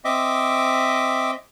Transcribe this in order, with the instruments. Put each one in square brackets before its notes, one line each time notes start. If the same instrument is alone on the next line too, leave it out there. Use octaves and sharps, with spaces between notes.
[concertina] C4 D#5 E5 D6